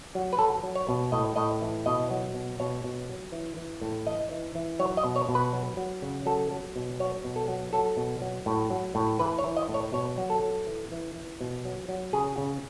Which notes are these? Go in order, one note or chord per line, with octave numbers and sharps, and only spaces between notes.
F#3
B4
F#3 A4
F#3
C#5
B2
A2 D#5
A2 D#5
E3
B2 D#5
F#3
B2
B2 C#5
B2
F#3
E3
E3
A2
E3 D#5
E3
E3
F#3 C#5
D#5
B2
C#5
B2
B4
F#3
F#3
C#3
F#3 A4
F#3
B2
F#3 C#5
B2
A4
F#3
F#3 A4
B2
F#3
A2
F#3
A2
E3 B4
C#5
E3
D#5
A2
C#5
B2 C#5
F#3
A4
F#3
E3
E3
E3
B2
F#3
F#3
C#3 G#4
C#3